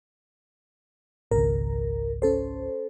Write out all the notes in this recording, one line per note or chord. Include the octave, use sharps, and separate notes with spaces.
G#1 C#2 A#4
C#4 A4 C5